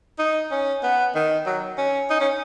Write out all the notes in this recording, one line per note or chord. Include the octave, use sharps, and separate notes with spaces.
D#4
C#4
B3
D#3
F#3
C#4
D#4
C#4